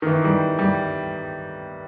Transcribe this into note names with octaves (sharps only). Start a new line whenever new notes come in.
D#3
E3
G3
G3